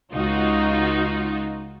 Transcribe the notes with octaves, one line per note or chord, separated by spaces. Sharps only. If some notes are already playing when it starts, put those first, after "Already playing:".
C#2 D#4 F4 F#4